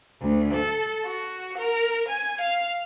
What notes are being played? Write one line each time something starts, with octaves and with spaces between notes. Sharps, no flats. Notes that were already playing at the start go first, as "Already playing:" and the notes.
D2
A4
F#4
A#4
G#5
F5